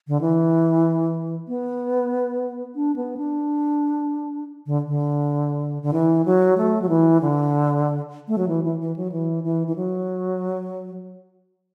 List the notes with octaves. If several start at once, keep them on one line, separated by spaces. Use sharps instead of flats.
D3
E3
B3
D4
B3
D4
D3
D3
D3
E3
F#3
A3
F#3
E3
D3
A3
F#3
E3
E3
E3
F#3
E3
E3
E3
F#3